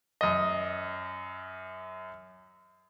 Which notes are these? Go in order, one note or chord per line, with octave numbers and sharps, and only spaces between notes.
F#2 D#5